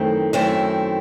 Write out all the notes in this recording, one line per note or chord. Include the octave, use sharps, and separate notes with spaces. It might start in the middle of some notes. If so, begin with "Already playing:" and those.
Already playing: F#2 D#3 A3 C4 E4
F#2 D#3 A3 C4 E4